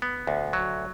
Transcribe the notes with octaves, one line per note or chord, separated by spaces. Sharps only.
B3
D2
F#3